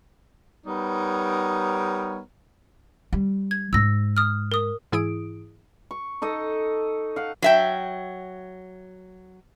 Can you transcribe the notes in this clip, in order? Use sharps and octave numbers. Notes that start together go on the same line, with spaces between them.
G3 B3 D#4 A#4 C#5
G3
G#6
G#2 G#3 E6 A#6
D#6 F6
A#4 D#6
G#2 E3 E4 G#4 D#6 D7
C#6
D#4 A4 D#5
F5 F#5
F#3 E5 G5